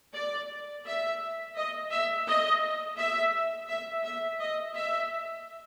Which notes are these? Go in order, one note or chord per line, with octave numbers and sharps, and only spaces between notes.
D5
E5
D#5
E5
D#5
E5
E5
E5
D#5
E5